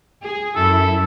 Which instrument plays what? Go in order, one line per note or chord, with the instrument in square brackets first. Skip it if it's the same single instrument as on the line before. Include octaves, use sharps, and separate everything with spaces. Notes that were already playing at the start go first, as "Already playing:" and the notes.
[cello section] G#4
[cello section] F#2 E4 [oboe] A4